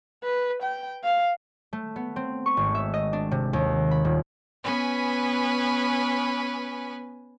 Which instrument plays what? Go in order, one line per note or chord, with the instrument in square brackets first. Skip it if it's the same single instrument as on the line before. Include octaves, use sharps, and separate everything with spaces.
[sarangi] B4
G5
F5
[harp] A3
B3
C4
C#6
G#1
E5
D#5
D4
C3
D#2
B5
D#1
[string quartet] B3 C#4 B4 G#5